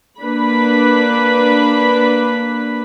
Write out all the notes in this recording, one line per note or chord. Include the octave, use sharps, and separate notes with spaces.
A#3 D4 B4 B5